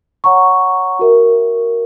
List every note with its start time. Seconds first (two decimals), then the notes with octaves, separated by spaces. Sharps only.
0.24 C#5 F#5 A#5 C#6
0.99 F#4 A#4 E5